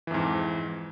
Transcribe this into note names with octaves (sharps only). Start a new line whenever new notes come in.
F2 G#2 E3